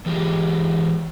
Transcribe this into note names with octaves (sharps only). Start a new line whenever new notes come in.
E3 G#3 G4